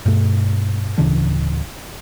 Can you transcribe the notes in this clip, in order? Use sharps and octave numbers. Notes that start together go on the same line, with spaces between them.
G2 B2 A3
D1 C#3 E3 D4